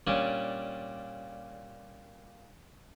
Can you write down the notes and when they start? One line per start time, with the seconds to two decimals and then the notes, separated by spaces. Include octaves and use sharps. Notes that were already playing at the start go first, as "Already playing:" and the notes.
0.07 A#2 G3 C#4 D4 G#5